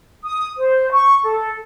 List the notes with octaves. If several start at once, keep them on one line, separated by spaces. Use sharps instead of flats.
D#6
C5
C#6
A4